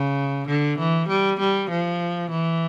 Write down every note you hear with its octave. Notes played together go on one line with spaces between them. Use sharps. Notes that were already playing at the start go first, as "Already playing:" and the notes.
Already playing: C#3
D3
E3
G3
G3
F3
E3